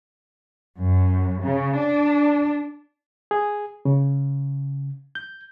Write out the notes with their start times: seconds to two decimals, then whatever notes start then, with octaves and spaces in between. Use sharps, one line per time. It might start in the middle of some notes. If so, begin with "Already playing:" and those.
0.77 F#2
1.41 C#3
1.75 D4
3.31 G#4
3.85 C#3
5.15 G6